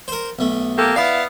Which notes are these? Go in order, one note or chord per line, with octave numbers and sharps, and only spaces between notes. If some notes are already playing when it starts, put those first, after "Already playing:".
A#4 C5
B1 A3
A#3 G4 A4
B3 E4 D5 F5